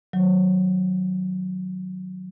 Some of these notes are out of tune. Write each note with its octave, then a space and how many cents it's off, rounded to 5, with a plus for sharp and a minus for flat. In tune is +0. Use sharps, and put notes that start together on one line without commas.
D#3 +0 F#3 +0